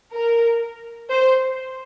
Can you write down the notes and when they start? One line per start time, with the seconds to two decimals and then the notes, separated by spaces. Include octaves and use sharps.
0.14 A#4
1.10 C5